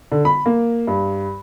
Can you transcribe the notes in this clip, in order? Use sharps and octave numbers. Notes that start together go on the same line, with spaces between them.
D3
B5
A#3
G2